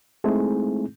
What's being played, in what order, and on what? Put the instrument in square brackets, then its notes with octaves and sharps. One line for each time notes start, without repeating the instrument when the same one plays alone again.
[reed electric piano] G#3 A3 C4 D#4 E4 G#4